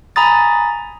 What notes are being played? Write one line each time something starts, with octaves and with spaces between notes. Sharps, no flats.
G#5 A#5 B5 D#6 A6